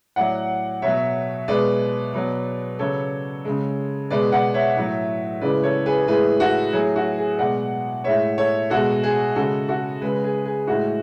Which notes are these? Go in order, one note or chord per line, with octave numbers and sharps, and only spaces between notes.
A2 F#3 D5 F#5
B2 F#3 C#5 E5
B2 G#3 B4 D5
B2 F#3
C#3 F#3 A4 C#5
C#3 G#3
B2 G#3 B4 D5
D5 F#5
C#5 E5
A2 F#3
C#3 E3 G#3 B4 D5
A4 C#5
G#4 B4
A2 E3 G#3 G#4 B4
F#4 A4
A2 F#3 G#4
F#4
G#4
B2 G#3 D5 F#5
A2 G#3 C#5 E5
A4 C#5
B2 G#3 F#4 A4
G#4
C#3 G#3 F#4 A4
F#4 A4
C#3 G#3 G#4 B4
G#4
G#4
A2 G#3 F#4